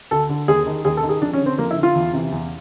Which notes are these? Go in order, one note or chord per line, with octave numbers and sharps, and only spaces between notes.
D2 A4
D3
D#2 G#4
D#3
D#2 G#4
A4
D#3
G#4
F2 D4
C#4
D3
C4
F2 A#3
E4
D3
F4
E2
C3 E3
E2